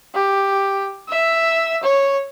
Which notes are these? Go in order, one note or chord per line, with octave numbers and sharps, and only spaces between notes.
G4
E5
C#5